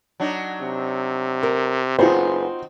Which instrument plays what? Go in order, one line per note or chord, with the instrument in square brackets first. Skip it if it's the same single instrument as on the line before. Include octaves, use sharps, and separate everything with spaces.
[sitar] F#3 D4 D#4
[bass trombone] C3
[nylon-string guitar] A#4
[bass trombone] F#1 [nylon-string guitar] B3 G#4 [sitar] C4 D#4 F#4 [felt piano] F4 C5